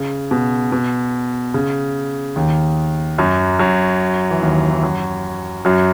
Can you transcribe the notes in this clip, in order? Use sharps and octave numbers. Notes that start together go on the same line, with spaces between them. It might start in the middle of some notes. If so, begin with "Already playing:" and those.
Already playing: C#3
B2
B2
C#3
D#2 D#3
F#2 F#3
F#2 F#3
E3
D#2 D#3
E3
F#2 F#3
F#2 F#3